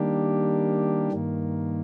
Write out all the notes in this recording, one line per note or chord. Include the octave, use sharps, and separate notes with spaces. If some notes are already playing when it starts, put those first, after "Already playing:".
Already playing: D#3 G3 A#3 D4 G4
G2 D#3 A#3